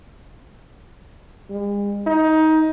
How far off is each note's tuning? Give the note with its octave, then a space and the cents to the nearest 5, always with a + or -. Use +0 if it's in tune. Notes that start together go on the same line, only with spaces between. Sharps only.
G#3 -45
D#4 +20